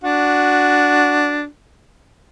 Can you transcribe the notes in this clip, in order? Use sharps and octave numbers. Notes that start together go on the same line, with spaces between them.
D4 F#4